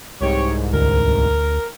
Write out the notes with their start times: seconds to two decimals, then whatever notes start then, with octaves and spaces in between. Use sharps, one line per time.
0.20 C2 G#2 G4 C#5
0.73 D2 A#4